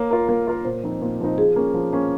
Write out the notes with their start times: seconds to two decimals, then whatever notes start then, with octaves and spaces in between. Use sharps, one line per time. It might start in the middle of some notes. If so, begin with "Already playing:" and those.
Already playing: A#3 C#5
0.11 F4 A#4
0.29 A#3
0.47 F4 A#4
0.65 A#2 C5
0.83 F3 C4 D#4
1.01 A#2
1.20 F3 C4 D#4
1.38 F3 G#4
1.56 A#3 C#4
1.74 F3
1.93 A#3 C#4